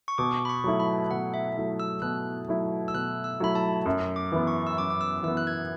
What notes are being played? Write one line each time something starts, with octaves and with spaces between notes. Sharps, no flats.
C#6
B2 D6
B5
C#6
F#3 A3 E4
B5
B2 F#5
E5
F#3 A3 E4
E6
B2 F#6
F#3 A3 E4
E6
B2 F#6
E6
F#3 A3 E4 B5
A5
F#2
D6
E3 B3
C#6
E6
F#2 D6
D6
E6
E3 B3 E6
F#6
G#6